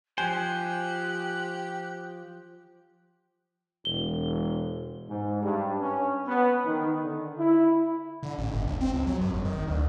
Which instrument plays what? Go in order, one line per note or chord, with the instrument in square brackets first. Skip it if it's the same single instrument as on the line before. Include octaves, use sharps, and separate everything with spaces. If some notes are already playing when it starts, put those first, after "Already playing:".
[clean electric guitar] F3 C5 [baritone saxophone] G4 [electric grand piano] G#5 [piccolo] F#6
[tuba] E1 [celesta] G7
[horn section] G#2
G2
C#4
B3
D#3
D3
E4
[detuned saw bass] D3
A1
G1
C#2
C4
C#2
F#3
F#2
G#1
D#3
D2